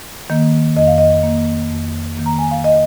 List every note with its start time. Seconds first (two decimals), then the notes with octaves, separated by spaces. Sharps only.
0.30 D#3 A#3
0.76 F2 D#5
0.87 F5
0.98 D#5
1.23 D#3 A#3
1.71 F2
2.17 D#3 A#3
2.26 A#5
2.39 G#5
2.51 F5
2.64 D#5